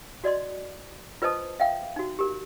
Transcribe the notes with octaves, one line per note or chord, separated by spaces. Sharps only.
F#4 D5 D#5 C6
F4 B4 C5 D#5 A5 D#6
E5 F5 G5
D#4 F#4
G4 A#4